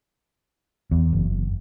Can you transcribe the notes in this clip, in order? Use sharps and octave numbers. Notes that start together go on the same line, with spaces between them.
E2
F#1